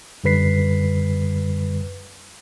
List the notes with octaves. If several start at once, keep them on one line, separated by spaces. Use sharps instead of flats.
F#2 D3 G3 B4 B6 C7